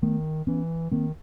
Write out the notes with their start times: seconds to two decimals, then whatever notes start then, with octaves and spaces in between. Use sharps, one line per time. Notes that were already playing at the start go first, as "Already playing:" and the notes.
0.02 D#3 A3 B3
0.47 E3 B3 C#4
0.91 D#3 A#3 C4